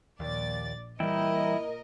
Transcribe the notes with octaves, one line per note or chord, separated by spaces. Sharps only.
A#1 D#2 D5 A6
A#2 E3 G3 E4 A#4 D#5 G5